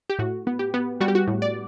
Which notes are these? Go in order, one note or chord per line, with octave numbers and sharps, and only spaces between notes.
G4
A2 F#4
B3
G4
B3
G3 F#4
G4
F#4
A2
D5